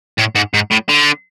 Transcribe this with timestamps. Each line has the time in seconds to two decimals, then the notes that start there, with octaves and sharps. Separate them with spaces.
0.19 A2
0.35 G#2
0.54 G#2
0.71 A2
0.89 D3